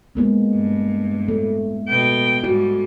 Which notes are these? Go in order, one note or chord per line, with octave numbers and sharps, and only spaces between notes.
G#3 A#3 B3
G2
A3
B2 G5
G#2 G3 F#4